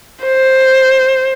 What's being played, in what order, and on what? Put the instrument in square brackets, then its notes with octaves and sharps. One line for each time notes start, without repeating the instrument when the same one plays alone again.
[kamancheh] C5